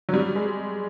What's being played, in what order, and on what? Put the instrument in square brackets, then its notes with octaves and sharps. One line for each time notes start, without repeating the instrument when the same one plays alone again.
[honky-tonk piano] F#3
G3
G#3